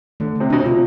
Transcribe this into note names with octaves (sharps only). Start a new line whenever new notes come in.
D3 A3
C3 A3
B2 D4
C3
F4